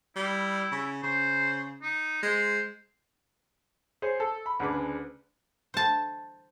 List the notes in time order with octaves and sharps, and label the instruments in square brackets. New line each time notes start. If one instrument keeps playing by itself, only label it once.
[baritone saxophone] G3 [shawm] E4
[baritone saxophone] C#3
[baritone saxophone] C#3 [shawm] C5
[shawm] D#4
[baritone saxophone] G#3 [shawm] C5
[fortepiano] G#4 C5 C#5
A4
B5
D2 C#3 D4 G#4 B4 D6
[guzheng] C5 A5